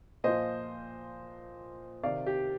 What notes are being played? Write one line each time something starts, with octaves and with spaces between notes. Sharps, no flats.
A#2 F3 C5 D#5
C3 D#3 D5 F5
G4